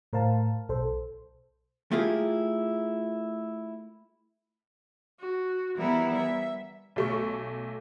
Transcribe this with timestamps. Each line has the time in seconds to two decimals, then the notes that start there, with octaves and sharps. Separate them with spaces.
0.13 A2 A#4 C5 F5 A5
0.69 B1 A4 C5
1.91 A3 E4 F4 G4 G#4 A#4
5.20 F#4
5.76 E3 G3 B3 E4 A#4 B4
6.15 E5
6.96 B1 A3 C#6